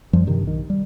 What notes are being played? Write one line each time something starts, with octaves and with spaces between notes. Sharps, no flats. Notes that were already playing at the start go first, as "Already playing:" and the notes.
F#2 F3 G3
G2 C3 D#3
B1 D#3
G3